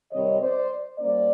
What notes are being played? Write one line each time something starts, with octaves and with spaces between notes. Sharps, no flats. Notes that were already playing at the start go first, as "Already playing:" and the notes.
C3 D#3 G3 C4 C#5 D#5
C5 D5
G3 A#3 C#4 C5 D5